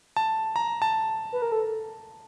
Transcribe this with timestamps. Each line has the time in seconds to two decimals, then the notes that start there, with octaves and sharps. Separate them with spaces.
0.17 A5
0.56 A#5
0.82 A5
1.32 B4
1.42 A#4
1.52 A4